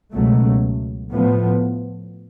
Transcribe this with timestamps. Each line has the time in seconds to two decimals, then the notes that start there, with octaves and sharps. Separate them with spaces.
0.11 C#2 B2 F#3 A3
1.11 A2 F3 B3